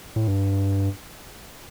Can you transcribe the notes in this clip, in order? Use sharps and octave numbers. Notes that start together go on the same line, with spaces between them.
A2
G2